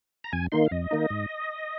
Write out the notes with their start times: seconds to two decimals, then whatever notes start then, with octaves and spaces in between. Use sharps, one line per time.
0.24 A#5
0.32 F2 G#5
0.52 D#3 A#3 D#4 C6
0.66 F5
0.71 F2 D#5
0.91 D#3 A#3 D#4
1.10 G#2